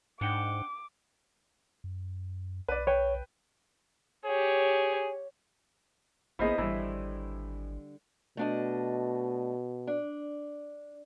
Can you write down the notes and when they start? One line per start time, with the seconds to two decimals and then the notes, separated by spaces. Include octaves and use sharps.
0.21 G#2 D4 F#5 G5 D6
1.84 F#2
2.68 B1 B4 D5
2.87 B4 C#5 G5
4.25 G4 G#4 C#5
6.39 A1 A#3 B3 C#4 E4 G#4 C5 D#5
6.58 G#1 A2 D3 E3 G3 E5
8.37 B2 A3 D4 D#5
9.87 D4